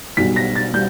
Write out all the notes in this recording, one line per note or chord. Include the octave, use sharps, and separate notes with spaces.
B1 B2 G3 B6
A#6
A6
G3 G6